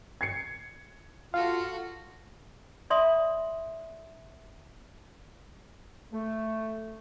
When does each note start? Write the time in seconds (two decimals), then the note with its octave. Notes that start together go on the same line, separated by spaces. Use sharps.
0.21 G#6 C7 C#7
1.34 F4 F#4 A4 F5
2.90 D5 E5 B5 C6 D#6
6.13 A3